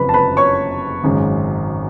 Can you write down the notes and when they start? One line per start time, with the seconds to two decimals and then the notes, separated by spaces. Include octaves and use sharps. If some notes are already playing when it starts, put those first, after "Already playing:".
Already playing: F#1 F2 C#3 B4 B5
0.09 A5
0.14 B4 B5
0.37 C#5 C#6
1.04 G#1 F#2 C#3 G#3